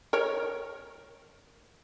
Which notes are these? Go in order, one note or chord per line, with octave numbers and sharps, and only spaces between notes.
A#4 C#5